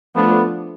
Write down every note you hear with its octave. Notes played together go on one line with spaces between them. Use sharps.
F3 A3 B3 D4